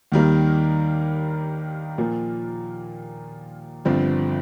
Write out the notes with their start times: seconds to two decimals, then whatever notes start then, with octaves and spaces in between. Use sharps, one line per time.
0.12 D#2 D#3 G3 A#3
1.98 A#2 F3 A#3
3.85 G1 G2 D3 F3 C4